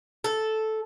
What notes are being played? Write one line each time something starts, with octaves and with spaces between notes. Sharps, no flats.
A4